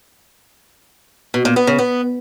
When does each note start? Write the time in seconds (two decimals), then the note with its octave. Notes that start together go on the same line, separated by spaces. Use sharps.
1.34 B2
1.45 A#2
1.56 B3
1.67 C#3
1.79 B3